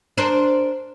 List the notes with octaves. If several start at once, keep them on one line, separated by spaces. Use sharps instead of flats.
D4 A#4 C5